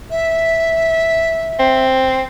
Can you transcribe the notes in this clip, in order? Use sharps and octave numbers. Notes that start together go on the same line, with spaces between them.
E5
C4